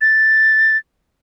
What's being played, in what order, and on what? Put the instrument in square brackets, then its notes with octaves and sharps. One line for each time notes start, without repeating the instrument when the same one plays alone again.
[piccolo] A6